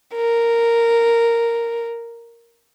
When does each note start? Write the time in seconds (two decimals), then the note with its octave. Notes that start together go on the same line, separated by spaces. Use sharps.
0.15 A#4